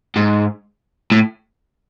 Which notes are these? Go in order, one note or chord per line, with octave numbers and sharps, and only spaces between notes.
G#2
A2